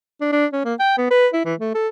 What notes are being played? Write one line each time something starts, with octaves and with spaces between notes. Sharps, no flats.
D4
D4
C#4
A#3
G5
B3
B4
E4
E3
A3
A4